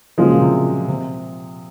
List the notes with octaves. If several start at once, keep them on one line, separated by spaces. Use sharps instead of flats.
C#3 F3 F#3 G#3 A#3 F4
A#2
C3
C3